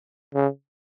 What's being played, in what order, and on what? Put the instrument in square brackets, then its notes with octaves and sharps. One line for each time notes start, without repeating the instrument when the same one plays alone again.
[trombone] C#3